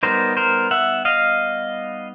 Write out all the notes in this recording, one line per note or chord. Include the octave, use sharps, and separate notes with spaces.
G3 B3 D#4 A#4 C5
A#4 C5
E5 F#5
D#5 F5